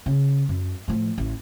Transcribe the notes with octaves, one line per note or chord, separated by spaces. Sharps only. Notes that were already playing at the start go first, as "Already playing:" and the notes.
C#3
F#2
A2 F3
A1